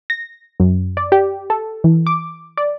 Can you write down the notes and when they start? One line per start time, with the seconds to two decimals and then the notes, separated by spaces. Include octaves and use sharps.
0.10 A#6
0.60 F#2
0.97 D5
1.12 G4
1.50 A4
1.84 E3
2.07 D6
2.57 D5